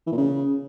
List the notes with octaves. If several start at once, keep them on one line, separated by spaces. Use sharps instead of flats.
E3
A#2
C#3